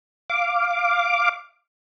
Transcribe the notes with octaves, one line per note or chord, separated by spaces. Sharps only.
F5 D6